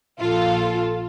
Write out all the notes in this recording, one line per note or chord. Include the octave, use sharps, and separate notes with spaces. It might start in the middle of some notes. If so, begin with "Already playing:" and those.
A#1 F4 A4